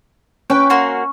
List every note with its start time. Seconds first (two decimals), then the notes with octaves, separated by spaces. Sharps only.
0.50 C#4 B4 G5
0.70 A#3 F#4 C6